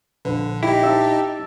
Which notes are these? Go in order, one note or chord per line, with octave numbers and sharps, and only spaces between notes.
A#1 D3 B4
D#4 E4 G4
E5 A5